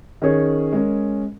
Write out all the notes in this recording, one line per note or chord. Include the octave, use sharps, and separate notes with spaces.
D#3 C#4 G#4 C#5
G#3 C#4 A#4